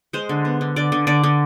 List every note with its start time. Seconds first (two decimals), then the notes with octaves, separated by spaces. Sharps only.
0.13 G#3 C5
0.29 D3
0.45 B3
0.61 D3
0.76 D3 D5
0.92 D3
1.07 D3 D5
1.24 D3